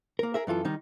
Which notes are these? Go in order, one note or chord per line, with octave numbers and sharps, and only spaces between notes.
A#3 A#4
G#4 A#4 E5
F#2 E3 F4 A4
D#3 G3 D#4